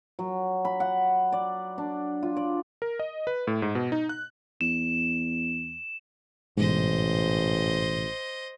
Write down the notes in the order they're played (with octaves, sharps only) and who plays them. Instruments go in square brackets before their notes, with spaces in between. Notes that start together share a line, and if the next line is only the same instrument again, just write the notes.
[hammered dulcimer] F#3
B5
F#5
D5
D4
F4
D5
[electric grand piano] A#4
D#5
B4
A2
G#2
B2
D#4
F#6
[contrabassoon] E2 [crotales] E7
[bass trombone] A1 [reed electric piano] G#2 B2 E3 [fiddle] C5 D#5